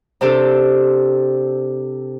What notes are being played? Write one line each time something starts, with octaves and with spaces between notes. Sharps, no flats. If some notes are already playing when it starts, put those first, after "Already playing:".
C3 C4 D4 G4 A4